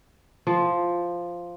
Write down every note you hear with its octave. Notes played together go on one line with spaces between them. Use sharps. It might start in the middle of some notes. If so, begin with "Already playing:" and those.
F3